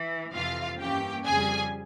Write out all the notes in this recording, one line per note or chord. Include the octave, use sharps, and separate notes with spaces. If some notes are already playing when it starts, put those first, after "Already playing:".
Already playing: E3
F2 C3 E3 F4 F5
G2 E3 A#3 C#4 G4 G5
F2 C#3 G3 G#4 G#5